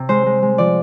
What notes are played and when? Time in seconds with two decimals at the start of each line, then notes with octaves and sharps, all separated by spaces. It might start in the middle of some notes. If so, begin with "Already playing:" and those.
Already playing: C3
0.09 G#3 C5
0.26 G#3
0.42 G#3
0.58 F3 D5